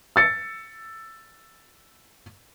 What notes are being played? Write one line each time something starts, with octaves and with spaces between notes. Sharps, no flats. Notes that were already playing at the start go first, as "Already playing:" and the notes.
E6 A6 C#7